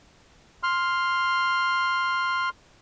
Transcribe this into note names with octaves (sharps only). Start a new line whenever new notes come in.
C6 F6